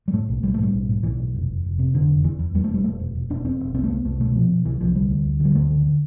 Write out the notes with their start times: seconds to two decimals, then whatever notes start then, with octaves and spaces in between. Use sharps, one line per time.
0.08 G3
0.13 A2 A3
0.29 B1
0.43 B1 G3
0.54 A3
0.59 A2 G3
0.73 B1
0.89 A2
1.03 B1 E3
1.19 B1
1.35 F1
1.49 F1
1.64 F1
1.79 C3
1.94 F1 D3
2.09 F1
2.24 E2 E3
2.39 E2
2.54 E2 G3
2.64 A3
2.69 E1
2.74 G3
2.84 E1 A3
3.00 E1
3.15 E1
3.30 E1 D4
3.44 E2 C4
3.60 E1
3.74 C2 C4
3.84 A3
3.89 C2 B3
4.04 C2 A3
4.20 B2 A3
4.35 B2 F3
4.50 B2
4.65 C2 E3
4.81 C2 F3
4.95 D2 G3
5.10 D2
5.25 D2
5.40 D3 G3
5.55 D2 A3
5.70 D3
5.86 D3